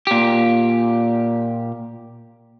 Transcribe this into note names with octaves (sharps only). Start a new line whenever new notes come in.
A#2 G4